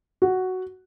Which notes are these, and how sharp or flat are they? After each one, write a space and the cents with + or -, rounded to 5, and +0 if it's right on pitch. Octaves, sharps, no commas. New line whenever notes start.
F#4 +5